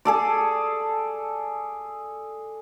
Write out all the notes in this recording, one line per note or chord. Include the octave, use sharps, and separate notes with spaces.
G#4 A4 D5